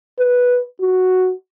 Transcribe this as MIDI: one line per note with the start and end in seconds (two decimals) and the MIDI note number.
0.20 0.61 71
0.81 1.33 66